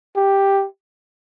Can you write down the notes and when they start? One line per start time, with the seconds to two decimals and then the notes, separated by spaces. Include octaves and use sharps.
0.16 G4